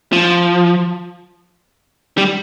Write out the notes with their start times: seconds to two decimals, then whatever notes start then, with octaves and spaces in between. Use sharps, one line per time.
0.13 F3
2.18 G3